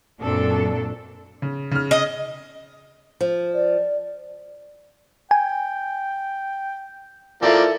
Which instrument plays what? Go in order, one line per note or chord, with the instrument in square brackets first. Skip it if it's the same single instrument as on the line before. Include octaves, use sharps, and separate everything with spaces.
[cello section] F#2 A#2 C4 D4 A4
[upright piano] C#3
C#3 F6
[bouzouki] D#5
[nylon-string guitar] F3
[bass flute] D5
[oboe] G5 [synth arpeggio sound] G#5
[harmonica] F3 A#3 D5 [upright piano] E4 A4